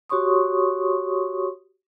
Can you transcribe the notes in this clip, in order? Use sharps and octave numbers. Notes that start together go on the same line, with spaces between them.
F#4 G4 C#5 C6 C#6 D#6